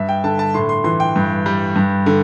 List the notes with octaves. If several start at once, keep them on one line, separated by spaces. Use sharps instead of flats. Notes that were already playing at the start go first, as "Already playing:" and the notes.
Already playing: G2 E5
G5
D3 A5
A5
A2 C6
C6
E3 C6
G5
G2
G3
G2
D3